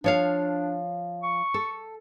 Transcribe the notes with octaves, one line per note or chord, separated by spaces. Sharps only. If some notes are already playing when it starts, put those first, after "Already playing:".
F3 D4 C#5 F5
C#6
A4